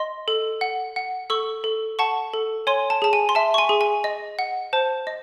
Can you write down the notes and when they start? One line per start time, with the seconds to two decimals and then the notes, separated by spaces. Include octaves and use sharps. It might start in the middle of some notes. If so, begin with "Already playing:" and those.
Already playing: D#5 C6
0.28 A4
0.61 F#5
0.96 F#5
1.30 A4 C#6 E6
1.64 A4
1.99 F#5 A5 C#6
2.34 A4
2.67 C#5 G#5 C6
2.90 A5
3.02 G#4 A5
3.13 G#5
3.29 C6
3.35 E5 A5
3.54 C#6
3.58 G#5 C6
3.69 G#4
3.81 G#5
4.04 D#5
4.39 F#5
4.73 C5 A5
5.07 D#5